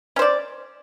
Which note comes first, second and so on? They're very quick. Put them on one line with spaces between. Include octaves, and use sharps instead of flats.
C#4 C5 D5